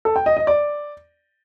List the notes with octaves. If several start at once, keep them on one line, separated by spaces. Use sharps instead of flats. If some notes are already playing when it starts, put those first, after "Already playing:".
A4
G5
D#5
D#5
D5